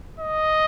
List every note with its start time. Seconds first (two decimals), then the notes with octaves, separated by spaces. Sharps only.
0.20 D#5